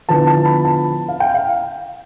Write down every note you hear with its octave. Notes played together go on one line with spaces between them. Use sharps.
D3 F3 B3 E4 A5
A5
B5
A5
F5
G5
F5